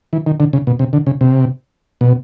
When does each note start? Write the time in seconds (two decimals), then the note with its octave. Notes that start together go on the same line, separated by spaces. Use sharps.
0.13 E3
0.26 D#3
0.40 D3
0.53 C#3
0.67 B2
0.79 C3
0.93 D3
1.07 C#3
1.21 C3
2.01 B2